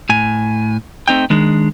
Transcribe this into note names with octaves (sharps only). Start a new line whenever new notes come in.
A2 G#5
A3 C4 D#4 G5
D#3 G#3 D4 G#4